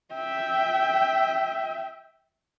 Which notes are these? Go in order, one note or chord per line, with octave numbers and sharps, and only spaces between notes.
E5 G5